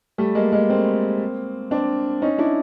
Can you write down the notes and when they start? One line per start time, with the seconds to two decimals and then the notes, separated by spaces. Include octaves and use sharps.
0.18 G3 A3
0.35 G#3 A#3
0.52 G#3 A#3
0.69 A#3 C4
1.71 C4 D4
2.22 C#4 D#4
2.38 D4 E4